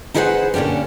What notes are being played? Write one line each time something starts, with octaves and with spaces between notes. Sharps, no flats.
D#4 E4 G#4 B4 C5 F#5
A#2 D3 C#4 D4 G4